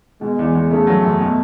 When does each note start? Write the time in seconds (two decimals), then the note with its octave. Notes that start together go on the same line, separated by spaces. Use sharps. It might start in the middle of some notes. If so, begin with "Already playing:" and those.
0.21 B2 G#3
0.39 E2
0.55 E2
0.71 C#3 A3
0.87 F#3
1.03 F#2
1.20 B2